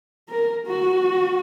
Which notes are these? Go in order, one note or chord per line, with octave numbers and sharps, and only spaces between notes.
A#4
F#4